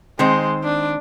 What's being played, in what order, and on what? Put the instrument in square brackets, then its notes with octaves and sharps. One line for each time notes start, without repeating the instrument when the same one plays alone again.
[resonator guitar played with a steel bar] D#3 C4 C5 [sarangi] G#3
[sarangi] D4